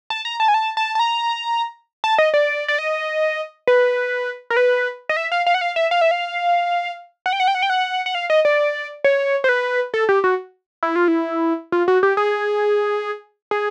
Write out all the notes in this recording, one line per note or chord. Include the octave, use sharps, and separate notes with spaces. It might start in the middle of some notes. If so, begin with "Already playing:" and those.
A5
A#5
A5
G#5
A5
A5
A5
A#5
A5
D#5
D5
D5
D#5
B4
A#4
B4
D#5
E5
F5
F5
F#5
F5
E5
F5
E5
F5
F#5
G5
F#5
G5
F#5
G5
F#5
F#5
F5
D#5
D5
C#5
C5
B4
A4
G4
F#4
E4
F4
E4
F4
F#4
G4
G#4
G#4